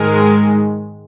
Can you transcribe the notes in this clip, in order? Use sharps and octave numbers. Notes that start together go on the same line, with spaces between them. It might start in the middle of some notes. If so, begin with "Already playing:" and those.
Already playing: G#2 D#3 G#3 A#4